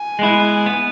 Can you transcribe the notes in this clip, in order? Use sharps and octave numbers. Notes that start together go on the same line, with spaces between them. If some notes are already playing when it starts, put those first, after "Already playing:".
Already playing: G#5
G#3 B3 E4
B3